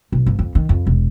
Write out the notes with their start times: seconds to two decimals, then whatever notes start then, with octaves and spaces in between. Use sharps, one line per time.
0.12 B1
0.26 G1
0.39 F2
0.55 D#3
0.69 F2
0.87 E1